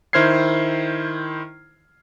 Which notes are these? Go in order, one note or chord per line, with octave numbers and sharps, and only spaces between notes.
D#3 E4 C5 F6 G#6 C7